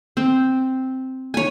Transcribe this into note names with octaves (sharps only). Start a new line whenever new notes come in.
C4
C#5 G#5